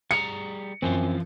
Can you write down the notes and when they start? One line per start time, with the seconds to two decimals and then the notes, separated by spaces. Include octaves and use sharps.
0.11 G3 G#4 A#5 C#7
0.82 F#2 E3 F3 C4 F4